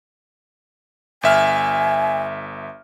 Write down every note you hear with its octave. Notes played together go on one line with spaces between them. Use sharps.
G1 E5 G#5 F6